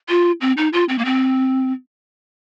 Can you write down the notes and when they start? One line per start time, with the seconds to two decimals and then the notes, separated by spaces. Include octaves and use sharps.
0.09 F4
0.41 C4
0.57 D#4
0.73 F4
0.89 C4
0.98 A#3
1.05 C4